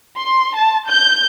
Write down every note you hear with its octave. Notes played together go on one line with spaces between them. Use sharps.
C6
A5
G6